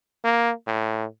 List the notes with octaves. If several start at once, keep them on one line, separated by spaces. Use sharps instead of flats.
A#3
A2